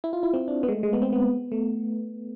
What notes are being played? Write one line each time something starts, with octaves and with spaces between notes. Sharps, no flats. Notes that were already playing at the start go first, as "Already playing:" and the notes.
E4
F4
E4
C4
D4
B3
G#3
A3
G#3
B3
C4
B3
A3